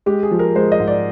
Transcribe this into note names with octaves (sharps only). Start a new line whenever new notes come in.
G#3 G4
G#4
F3
A#4
G#3 C5
D#5
G#2
D5